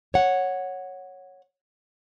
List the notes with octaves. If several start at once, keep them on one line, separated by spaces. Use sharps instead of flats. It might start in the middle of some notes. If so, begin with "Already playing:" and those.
C#5 F#5